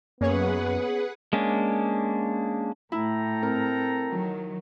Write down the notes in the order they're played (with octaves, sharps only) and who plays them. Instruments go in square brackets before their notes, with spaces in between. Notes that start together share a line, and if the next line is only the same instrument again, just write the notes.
[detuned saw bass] F#2 [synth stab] A#3 C#4 C#5 [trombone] B3 [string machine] G#4 B4 F#5
[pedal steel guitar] G#3 A#3 C#4 D4
[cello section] A2 [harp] E4 [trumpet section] A4 G5 A#5
[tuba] C4 [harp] A#4
[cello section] D#3 F#3